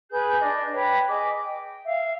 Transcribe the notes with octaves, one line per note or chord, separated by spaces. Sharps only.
G#4 B4 G6
D4 D5 D#5
B4 C#5 G5 A#5
G#4 D#5 D6
G5
E5 F5